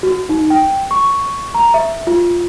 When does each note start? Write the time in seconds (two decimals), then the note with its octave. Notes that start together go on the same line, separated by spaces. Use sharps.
0.03 F#4
0.29 D#4
0.50 G5
0.91 C#6
1.54 A#5
1.74 E5
2.07 F4